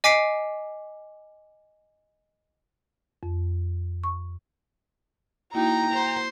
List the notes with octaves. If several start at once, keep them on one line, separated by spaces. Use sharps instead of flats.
D#5 G#5 D6 B6 C7 D7
F2
C#6
A#3 D#4 E4 F#4 G5 A#5
C5